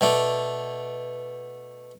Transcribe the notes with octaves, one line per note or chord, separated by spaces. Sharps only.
B2 A3 D4